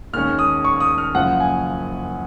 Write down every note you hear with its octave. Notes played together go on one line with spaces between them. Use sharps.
D#2 D#3 G#3 C#4 F6
D#6
C#6
D#6
F6
F#1 F#2 C#3 F3 F#5
G#5